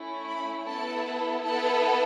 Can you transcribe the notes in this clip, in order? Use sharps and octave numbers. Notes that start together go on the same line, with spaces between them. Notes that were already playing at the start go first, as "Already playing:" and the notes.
Already playing: A3 C#4 E4
B5
B3 E4 A4 A5
B3 E4 A4 A5